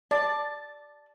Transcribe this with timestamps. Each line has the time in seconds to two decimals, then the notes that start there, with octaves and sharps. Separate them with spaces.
0.11 D5 A5